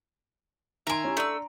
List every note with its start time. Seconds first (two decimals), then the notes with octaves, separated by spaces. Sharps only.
0.87 D#3 E5 G#5 A#5 C6 D7
1.04 C#4 E4 G4
1.17 A3 D4 E6